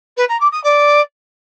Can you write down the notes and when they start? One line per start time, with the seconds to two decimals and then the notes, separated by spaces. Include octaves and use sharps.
0.17 B4
0.28 A#5
0.40 D6
0.52 D#6
0.63 D5